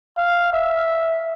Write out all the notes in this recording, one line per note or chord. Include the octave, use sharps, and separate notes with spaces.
F5
E5